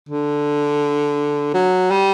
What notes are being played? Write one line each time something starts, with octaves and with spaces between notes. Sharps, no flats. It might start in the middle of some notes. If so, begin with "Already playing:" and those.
D3
F#3
G3